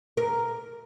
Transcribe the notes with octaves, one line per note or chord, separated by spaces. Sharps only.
A#4